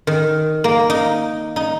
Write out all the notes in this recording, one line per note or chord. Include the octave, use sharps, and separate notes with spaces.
D#3
A#3
D#4
D#4